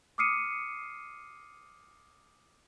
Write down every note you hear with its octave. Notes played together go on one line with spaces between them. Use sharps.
D6 D#6 F6 C7 C#7 D#7